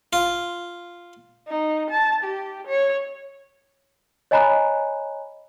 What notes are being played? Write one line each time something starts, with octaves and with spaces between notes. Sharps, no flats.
F4
D#4
A5
G4
C#5
C#5 D#5 G#5 A#5 B5 F#6